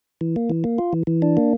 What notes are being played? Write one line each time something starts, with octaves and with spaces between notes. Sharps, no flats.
E3
A#3
E3
A#3
F4
E3
E3
D4
A#3